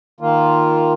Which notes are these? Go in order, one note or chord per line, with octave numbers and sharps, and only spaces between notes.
D#3 A#3 F4